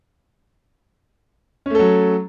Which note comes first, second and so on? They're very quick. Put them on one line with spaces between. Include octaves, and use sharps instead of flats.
C#4 A3 A4 F#3